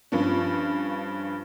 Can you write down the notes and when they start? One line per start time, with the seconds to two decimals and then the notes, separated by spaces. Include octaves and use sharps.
0.12 G2 F3 C#4